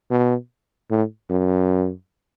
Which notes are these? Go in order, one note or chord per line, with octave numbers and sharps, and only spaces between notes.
B2
A2
F#2